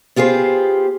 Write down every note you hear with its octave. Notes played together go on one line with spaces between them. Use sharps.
B3 F4 G4 G#4 C5